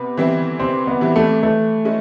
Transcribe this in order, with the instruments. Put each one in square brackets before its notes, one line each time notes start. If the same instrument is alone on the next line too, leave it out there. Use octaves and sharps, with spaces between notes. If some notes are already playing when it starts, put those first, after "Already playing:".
Already playing: [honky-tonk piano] C3 [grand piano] B3
[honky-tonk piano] E3 G3 C4 E4
[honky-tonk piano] C3 [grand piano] C4
[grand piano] B3
[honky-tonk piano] E3 G3 C4 E4
[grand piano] A3
[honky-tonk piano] E3 [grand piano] A3
[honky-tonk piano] G#3 C#4 E4